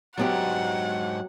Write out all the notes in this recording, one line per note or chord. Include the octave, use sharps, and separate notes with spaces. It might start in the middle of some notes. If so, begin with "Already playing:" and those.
G#2 F#3 B3 D4 G4 F#5